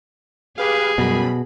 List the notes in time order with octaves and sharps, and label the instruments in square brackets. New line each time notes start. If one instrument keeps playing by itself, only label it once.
[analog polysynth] G4 B4 F5 [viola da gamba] G#4
[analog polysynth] F#2 G3 B5 [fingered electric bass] B2